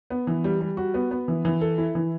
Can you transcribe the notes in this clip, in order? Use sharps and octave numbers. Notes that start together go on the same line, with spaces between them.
B3
E3
G3
G3
F#4
B3
B3
E3
E3
A4
E4
E3